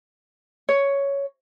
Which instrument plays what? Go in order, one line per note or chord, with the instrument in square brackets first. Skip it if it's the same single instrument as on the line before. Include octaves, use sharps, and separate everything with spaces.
[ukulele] C#5